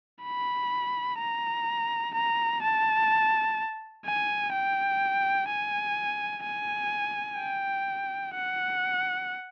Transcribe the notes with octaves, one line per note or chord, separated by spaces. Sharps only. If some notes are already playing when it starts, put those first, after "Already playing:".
B5
A#5
A#5
A5
G#5
G5
G#5
G#5
G5
F#5